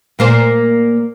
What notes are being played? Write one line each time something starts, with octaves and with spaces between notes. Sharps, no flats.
A#2 A#3 C5